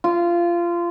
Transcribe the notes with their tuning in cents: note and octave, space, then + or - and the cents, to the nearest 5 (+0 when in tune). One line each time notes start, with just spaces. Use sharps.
F4 -20